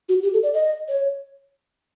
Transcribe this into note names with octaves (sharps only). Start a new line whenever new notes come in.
F#4
G4
A4
D5
D#5
C#5